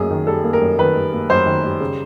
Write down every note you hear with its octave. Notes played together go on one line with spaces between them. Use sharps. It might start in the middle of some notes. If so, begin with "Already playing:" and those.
Already playing: F#2 A#3 G#4
D#3
G3 A4
A#3
A#4
F#2
D#3 B4
G3
A#3
F#2 C5
D#3
G3
C#3